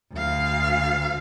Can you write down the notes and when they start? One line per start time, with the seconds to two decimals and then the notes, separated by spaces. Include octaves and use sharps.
0.13 D2 F5